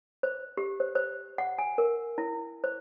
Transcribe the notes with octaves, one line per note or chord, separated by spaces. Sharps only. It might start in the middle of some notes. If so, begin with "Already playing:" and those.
C5
G4
C5
C5
F#5
G#5
A#4
E4
C5